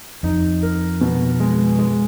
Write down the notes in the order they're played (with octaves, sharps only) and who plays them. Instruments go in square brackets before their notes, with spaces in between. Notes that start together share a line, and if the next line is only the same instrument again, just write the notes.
[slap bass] F2 [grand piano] D#4
[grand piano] A#4
B2
G#3
G#3